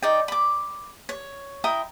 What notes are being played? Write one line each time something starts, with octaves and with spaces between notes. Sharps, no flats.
D#4 D5 G5
B5 D6
C#5
E4 G5 A#5 D#6